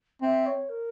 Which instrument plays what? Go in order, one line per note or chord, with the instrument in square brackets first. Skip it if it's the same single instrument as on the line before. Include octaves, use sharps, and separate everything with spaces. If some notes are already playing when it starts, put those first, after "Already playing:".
[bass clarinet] C4 [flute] E5
[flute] C#5
A#4